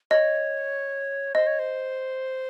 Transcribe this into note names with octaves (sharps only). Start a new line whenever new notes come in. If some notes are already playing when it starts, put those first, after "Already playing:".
C#5 D#5
C5 D#5
C#5
C5